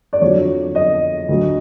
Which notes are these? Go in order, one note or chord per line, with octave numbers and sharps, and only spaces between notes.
D5
F2 D3 F#3 C#5
D#5
D2 D3 F#3